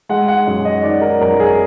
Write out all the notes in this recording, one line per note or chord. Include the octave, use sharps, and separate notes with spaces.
G#3 F#5
F#5
F#2
D#5
D#3 D5
A#4
F#2 A#4
G#4